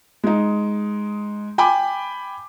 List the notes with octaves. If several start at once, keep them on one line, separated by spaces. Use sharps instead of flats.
G#3 D#4
G5 G#5 B5 D6